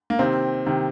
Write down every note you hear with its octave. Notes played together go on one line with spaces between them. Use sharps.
A#3
C3 D#3 C4
C3 D#3